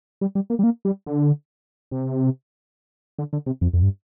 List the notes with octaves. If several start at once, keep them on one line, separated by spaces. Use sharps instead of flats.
G3
G3
A#3
G3
A#3
G3
D3
C3
D3
D3
C3
F2
F2
G2